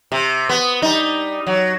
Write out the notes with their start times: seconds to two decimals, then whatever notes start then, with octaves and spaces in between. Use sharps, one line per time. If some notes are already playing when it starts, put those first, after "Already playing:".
0.12 C3
0.49 B3
0.82 G3 D#4
1.47 F#3